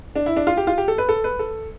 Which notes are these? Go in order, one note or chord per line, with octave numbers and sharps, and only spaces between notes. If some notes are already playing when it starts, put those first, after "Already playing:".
D4
E4
D4
F4
G4
F4
G4
A4
B4
A4
B4
A4